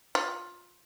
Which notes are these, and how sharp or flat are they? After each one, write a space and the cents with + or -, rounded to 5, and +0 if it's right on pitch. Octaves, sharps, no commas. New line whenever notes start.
F4 +15